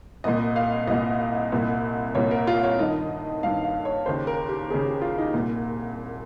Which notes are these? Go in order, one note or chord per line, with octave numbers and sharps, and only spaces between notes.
C2 A#2 D#5
F5
C2 A#2 D#5
C2 A#2
C2 A#2 C#5
A#4
F4
C#5
G2 D#3 D#5
G2 D#3 F5
F5
C#5
D#2 C#3 C5
A#4
G4
D#2 C#3 G#4
G4
F4
D#4
C2 A#2